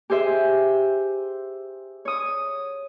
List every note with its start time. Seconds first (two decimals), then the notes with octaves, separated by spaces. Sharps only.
0.10 G4 G#4 C5 E5
2.05 C#5 D#6